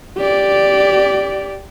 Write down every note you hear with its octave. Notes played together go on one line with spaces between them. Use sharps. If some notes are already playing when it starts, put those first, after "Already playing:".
G4 D5